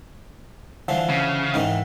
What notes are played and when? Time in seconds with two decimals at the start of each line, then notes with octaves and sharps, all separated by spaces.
0.88 D3 E3 F3
1.09 C#3
1.54 G#2 D#3 E3